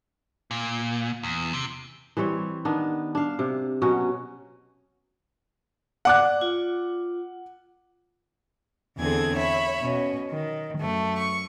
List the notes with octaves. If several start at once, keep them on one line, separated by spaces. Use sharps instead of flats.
A#2
E2
C3
E3 G3 C4 C#5
D#3 B3 D4
D4 F5
C3
B2 F#3 C#4 F#4
D5 F#5 D6 F#6
F4
E2 D3 C4 G#4 A4 G#6
C#5 E5 B5
B2 C#4
D#3
F#2 A3
C#6